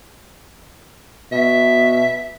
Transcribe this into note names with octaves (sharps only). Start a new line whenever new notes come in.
B2 E5